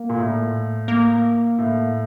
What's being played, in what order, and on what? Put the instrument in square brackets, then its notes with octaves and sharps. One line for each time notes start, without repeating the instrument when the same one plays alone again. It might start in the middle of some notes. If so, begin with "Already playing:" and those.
Already playing: [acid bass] A#3
[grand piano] A#2
A2
[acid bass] A#3
[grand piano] A2